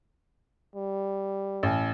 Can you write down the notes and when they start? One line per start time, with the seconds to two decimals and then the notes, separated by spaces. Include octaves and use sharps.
0.75 G3
1.63 A1